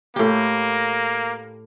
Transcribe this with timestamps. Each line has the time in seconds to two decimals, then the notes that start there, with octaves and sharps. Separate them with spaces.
0.16 A2 A#3 G4